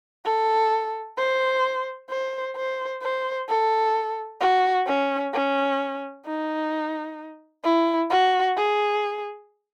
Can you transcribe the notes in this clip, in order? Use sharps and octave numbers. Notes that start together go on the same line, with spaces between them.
A4
C5
C5
C5
C5
A4
F#4
C#4
C#4
D#4
E4
F#4
G#4